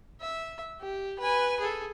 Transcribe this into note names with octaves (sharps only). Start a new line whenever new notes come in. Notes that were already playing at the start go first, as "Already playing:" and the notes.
E5
G4
B4 G#5
G#4 A4